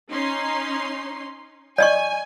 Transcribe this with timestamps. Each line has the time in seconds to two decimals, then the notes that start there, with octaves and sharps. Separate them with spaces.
0.11 C#4 D#4 C6
1.78 D5 D#5 G#5 C#6